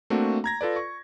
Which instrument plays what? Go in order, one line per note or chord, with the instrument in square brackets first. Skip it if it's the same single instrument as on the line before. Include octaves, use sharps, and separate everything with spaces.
[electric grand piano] A3 A#3 C4 D4 F#4
A#5 G#6 A#6
F4 A4 B4 D5
C#6